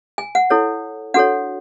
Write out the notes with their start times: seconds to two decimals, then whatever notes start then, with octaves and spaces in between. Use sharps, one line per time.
0.18 G#5
0.35 F#5
0.50 E4 A4 C#5
1.14 D4 F#4 A4 C#5 F#5